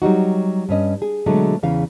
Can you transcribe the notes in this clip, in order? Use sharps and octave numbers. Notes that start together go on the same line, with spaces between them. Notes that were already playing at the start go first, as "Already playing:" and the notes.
F#3 G3 D#4 F#4
G2 C#4 D#5
G#4
B2 D3 F#3 G#3 A3
E2 C#3 E3 F5